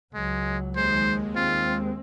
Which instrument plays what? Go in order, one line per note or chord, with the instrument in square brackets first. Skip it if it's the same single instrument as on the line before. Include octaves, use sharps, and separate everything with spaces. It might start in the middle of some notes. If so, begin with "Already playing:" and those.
[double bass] C#2 F#3 [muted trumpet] G#3
[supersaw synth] D#2 G#3 [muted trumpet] C5
[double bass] C4 [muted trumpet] F4